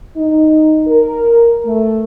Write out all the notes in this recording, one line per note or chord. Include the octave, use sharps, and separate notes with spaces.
D#4
A#4
A3